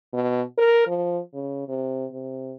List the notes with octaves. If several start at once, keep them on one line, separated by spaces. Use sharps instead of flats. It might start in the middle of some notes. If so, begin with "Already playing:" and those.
B2
A#4
F3
C#3
C3
C3